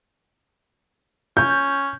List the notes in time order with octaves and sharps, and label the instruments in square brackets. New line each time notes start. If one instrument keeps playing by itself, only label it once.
[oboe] C#4 [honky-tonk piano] G6